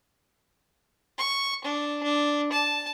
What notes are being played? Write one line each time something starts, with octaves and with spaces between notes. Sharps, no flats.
C#6
D4
D4
A5